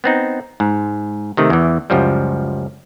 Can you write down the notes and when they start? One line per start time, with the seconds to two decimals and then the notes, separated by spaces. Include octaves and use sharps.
0.04 B3 C4 D#4
0.60 G#2
1.37 C3 D#3 A3
1.50 E2 E3
1.90 C#2 F#2 F3 G3